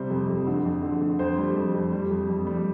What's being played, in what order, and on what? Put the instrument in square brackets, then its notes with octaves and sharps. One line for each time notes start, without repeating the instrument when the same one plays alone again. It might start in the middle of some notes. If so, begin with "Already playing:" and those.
Already playing: [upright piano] C3 G3 C5
F2
F2
D3
F2
D3
D3
F2 C5
G3
F2
F2
G3
F2
F2
G3